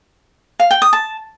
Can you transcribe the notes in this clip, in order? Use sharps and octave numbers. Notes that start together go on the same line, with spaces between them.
F5
G5
D#6
A5